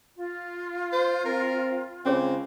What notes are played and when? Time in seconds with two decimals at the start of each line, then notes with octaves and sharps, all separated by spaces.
0.17 F4
0.93 C5
1.26 C4 A#4
2.06 C#2 C4 C#4 G#4 C#5